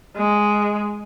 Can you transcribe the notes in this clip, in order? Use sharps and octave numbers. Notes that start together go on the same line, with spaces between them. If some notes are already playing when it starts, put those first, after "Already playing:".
G#3